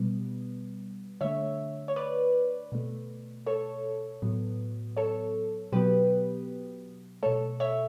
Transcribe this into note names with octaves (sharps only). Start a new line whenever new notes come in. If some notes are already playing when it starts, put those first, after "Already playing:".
Already playing: B2 G3 B3
D3 A3 C#5 E5
C#5
B4 D5
B2 A3
A4 C#5
A2 F#3 B3
A4 C#5
B2 F#3 B3 G4 B4
B2 A3 A4 C#5
C#5 E5